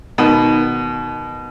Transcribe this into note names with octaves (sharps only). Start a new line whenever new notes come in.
B2 D#3